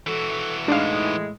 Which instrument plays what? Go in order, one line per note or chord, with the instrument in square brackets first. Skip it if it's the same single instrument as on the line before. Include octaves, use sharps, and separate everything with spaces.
[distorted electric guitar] E3 F#4 [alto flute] A4
[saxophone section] A2 G#3 [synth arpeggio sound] D4 F5 [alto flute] D#4